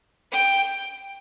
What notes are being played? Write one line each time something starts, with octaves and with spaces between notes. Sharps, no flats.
G5